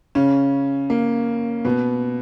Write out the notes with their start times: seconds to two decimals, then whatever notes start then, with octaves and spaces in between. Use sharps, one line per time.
0.15 C#3 C#4
0.90 A#3
1.65 B2 B3